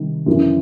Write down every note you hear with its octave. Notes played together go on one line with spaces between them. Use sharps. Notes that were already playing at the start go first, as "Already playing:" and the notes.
Already playing: C3 D#3 G3
F#2 C#3 E3